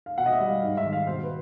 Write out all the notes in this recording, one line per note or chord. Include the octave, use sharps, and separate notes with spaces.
F5
B2 F#5
D#5
E5
G3
F5
G#2 F5
E5
D#3
F5
B2 C5
B4